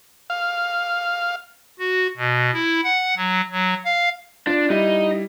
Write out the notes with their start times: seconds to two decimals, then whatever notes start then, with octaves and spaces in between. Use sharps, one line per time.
0.30 F5
1.79 F#4
2.17 B2
2.54 E4
2.84 F#5
3.17 F#3
3.51 F#3
3.85 F5
4.47 D4 F4 D5
4.70 G3 D#4 E4